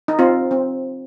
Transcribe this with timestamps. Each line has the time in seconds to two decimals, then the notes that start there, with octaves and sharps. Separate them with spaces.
0.08 D#4
0.19 C4 F4
0.51 C4